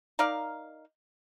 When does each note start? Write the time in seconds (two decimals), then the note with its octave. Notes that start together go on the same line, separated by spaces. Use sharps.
0.19 D#4 A#4 D5 F5